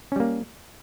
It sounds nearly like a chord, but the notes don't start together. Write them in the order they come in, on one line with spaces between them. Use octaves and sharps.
C#4 G3 A#3